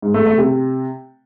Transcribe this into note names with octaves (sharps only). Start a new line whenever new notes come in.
G#2
A3
A3
C3